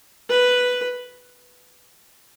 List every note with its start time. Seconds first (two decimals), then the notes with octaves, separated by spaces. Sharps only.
0.29 B4